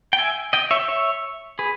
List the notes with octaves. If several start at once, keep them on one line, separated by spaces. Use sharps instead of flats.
G5
E5 G#5
D#5 G5
C#5 E5
C#5 E5
G#4 B4